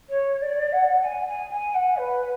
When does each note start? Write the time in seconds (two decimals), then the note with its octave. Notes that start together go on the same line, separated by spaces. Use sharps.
0.09 C#5
0.41 D5
0.72 F#5
1.03 G#5
1.27 G#5
1.50 G#5
1.74 F#5
1.97 B4